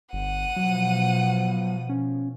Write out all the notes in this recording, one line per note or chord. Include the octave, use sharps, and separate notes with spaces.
G1 F#5 D#7
B2 F3 F#3
C#4